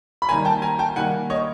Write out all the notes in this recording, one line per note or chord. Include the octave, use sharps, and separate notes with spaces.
B5
D#3 G3 A#3 G#5 A#5
G5 A5
G#5 A#5
G5 A5
D#3 G3 A#3 F#5 G#5
C#5 D#5